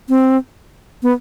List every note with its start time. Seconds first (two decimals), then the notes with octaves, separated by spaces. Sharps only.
0.09 C4
1.03 B3